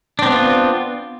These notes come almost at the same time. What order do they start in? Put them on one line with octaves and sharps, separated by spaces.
D4 C4 B3 F4